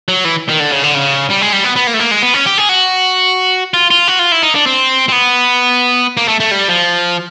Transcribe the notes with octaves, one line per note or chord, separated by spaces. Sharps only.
F#3
E3
D#3
D3
C#3
D3
C#3
G3
G#3
G3
B3
B3
A#3
A3
A#3
G#3
B3
C#4
G4
G#4
F#4
F4
F4
F#4
F4
E4
D#4
D4
C4
C4
B3
A#3
A3
A3
G3
F3